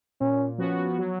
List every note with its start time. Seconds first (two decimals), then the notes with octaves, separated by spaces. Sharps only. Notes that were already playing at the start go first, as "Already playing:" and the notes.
0.20 A#2 C#4
0.58 F3 B3 C#4 F#4
0.98 F#3